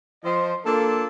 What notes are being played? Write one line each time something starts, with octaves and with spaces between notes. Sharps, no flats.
F3 C5 D#5
A#3 D4 F4 A4